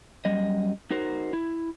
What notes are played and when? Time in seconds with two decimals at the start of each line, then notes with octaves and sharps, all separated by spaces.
0.25 F#2 G3 D#5
0.91 D#4 F#4 A#4 C5
1.33 E4